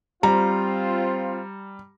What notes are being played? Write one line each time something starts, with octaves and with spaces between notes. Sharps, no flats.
G3 C4 F4 A#5